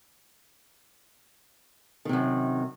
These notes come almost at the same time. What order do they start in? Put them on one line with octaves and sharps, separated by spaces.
D#3 C3 F#2